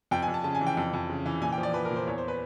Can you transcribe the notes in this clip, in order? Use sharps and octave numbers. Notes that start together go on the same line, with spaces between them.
F2 G5
G#5
F2
A5
C#3 A5
G#5
E3
G5
F2
F2
C#3
E3
A#2 G#5
G5
F3
D5
F3 B4
A#4
A#2
C5
E2 C#5
C5
B4